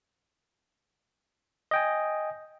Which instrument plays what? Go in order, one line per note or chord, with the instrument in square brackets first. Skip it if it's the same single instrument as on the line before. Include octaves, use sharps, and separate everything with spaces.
[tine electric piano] D#5 G5 G#5